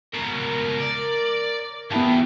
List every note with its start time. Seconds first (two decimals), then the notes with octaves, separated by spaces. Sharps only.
0.14 C#2 B2 A#4
0.80 D5
1.92 E2 B3 E4 F4 G4 A5